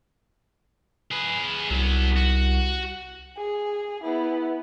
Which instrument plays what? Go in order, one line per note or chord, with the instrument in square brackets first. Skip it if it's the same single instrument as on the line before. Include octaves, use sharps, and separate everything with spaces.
[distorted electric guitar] G#4 B4
[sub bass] C2 [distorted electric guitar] F#3 B3
[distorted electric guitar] F#4
[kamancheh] G#4
B3 E4